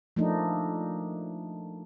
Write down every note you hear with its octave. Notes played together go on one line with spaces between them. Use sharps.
F3 A3 A#3 D4 D#4